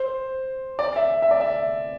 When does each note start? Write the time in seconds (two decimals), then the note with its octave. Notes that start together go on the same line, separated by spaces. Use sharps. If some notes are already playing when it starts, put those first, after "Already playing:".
Already playing: C5
0.79 D5
0.96 E5
1.22 E5
1.31 D5
1.41 E5